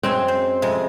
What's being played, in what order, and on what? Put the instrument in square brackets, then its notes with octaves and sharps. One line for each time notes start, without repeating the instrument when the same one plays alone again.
[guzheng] F#2 G#3 G#5 [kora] C4
[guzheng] C5
F2 C3 G#3